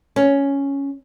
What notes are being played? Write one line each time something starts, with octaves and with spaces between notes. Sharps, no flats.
C#4